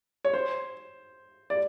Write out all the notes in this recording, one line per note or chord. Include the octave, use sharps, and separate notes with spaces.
C#5
C5
D5